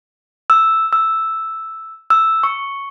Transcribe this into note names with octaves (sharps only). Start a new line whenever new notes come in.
E6
E6
E6
C#6